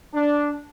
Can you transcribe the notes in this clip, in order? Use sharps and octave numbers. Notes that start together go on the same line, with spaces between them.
D4